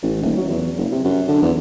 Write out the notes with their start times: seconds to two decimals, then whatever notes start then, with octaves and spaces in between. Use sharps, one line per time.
0.03 A1
0.22 D#1
0.37 F#3
0.49 E2
0.77 F#1
0.92 C3
1.04 F#2
1.28 D3
1.43 E2